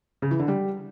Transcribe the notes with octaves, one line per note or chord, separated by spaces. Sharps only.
C#3
E3
D3
G3